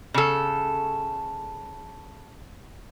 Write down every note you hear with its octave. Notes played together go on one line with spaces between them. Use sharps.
C#3 A4